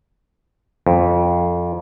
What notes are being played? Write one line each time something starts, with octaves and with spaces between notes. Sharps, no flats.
F2